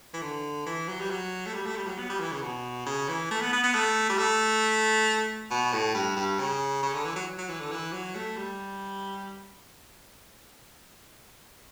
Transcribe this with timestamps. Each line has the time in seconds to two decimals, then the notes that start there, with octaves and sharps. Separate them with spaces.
0.13 E3
0.22 D3
0.66 E3
0.88 F#3
1.00 G3
1.10 F#3
1.46 A3
1.54 G3
1.66 A3
1.76 G3
1.87 F#3
1.98 B3
2.10 G3
2.20 E3
2.31 C#3
2.42 B2
2.86 C#3
3.09 E3
3.31 A3
3.41 B3
3.53 B3
3.63 B3
3.74 A3
4.09 G3
4.18 A3
5.51 B2
5.72 A2
5.94 G2
6.16 G2
6.39 C#3
6.83 C#3
6.94 D3
7.05 E3
7.16 F#3
7.38 F#3
7.49 E3
7.60 D3
7.71 E3
7.93 F#3
8.15 A3
8.37 G3